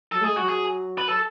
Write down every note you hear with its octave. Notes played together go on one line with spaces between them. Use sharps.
F#3 A4
A3
G#3 G#4
F#3 F#4
G#4
B4
A4